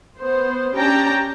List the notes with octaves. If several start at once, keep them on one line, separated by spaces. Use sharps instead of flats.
B3 C5
C#4 D4 G4 G5 A5 A#5